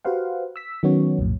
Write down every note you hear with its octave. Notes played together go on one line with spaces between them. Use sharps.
F#4 G4 B4 C5 F5 F#5
E6 B6
D#3 F#3 B3 C#4 F#4 C#5
B1 F2 A2